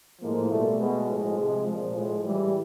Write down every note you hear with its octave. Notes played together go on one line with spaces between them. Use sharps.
A2 F3 G#3 A#3
B2 G3 A3
B2 G#3
A2 F3
C3 F3 G#3
A#2 F3
A2 F3 G#3
A2 E3 G3